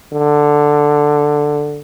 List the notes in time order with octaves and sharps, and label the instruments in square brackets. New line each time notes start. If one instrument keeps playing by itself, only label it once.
[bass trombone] D3